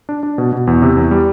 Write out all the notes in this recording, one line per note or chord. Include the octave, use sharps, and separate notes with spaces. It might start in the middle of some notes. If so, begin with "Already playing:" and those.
D4
D4
B2
B2
E2
C3
E2
G3